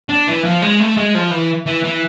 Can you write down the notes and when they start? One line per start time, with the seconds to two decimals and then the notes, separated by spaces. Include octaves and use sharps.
0.09 D4
0.28 E3
0.45 F3
0.62 G#3
0.80 A3
0.97 G#3
1.15 F3
1.31 E3
1.66 E3
1.83 E3